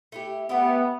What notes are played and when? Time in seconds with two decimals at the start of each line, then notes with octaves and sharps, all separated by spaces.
0.12 A3 E4 G4
0.49 A3 B3 E4 G4